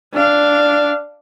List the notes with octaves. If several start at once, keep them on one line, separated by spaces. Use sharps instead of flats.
D4 F5